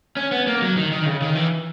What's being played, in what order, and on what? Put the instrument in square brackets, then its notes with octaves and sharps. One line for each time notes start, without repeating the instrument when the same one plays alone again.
[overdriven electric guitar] C#4
B3
A#3
F#3
D#3
D#3
C#3
D#3
E3